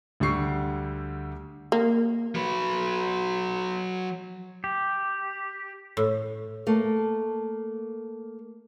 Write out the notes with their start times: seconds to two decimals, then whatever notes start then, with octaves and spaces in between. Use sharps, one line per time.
0.20 D2 D3 G3 G4 C#6 C7
1.72 A#3
2.35 F#3 B4
4.64 G4
5.97 A2
6.67 A3 A#3